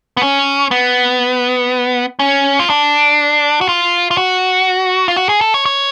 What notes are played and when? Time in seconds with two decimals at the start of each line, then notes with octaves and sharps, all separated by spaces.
0.17 B3
0.22 C#4
0.71 B3
2.19 C#4
2.60 F4
2.70 D4
3.61 F#4
3.69 F4
4.11 F4
4.17 F#4
5.08 F4
5.16 F#4
5.29 G#4
5.41 A4
5.54 C#5
5.66 C#5